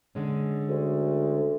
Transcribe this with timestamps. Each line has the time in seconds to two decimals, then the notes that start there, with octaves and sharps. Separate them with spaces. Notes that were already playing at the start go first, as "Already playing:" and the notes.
0.15 D3 G#3 C#4
0.69 D2